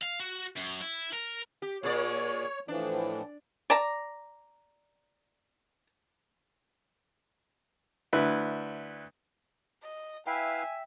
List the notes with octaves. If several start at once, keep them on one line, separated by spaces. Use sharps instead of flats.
F5
F#4
F#2
E4
A#4
G4
A#2 G#4 C#5 D5
A2 E3 F3 D4
D5 A5 A#5
D2 E4 B4
D#5
E4 B4 E5 F5 G5 G#5